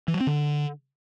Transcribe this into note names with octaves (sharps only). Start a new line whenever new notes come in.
E3
F#3
C4
D3